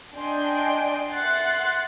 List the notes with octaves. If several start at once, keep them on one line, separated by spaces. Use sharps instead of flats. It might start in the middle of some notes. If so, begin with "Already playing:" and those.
D4 D5 D#5 G5 G#5 C6
E5 F#5 C6 F#6 A6 C7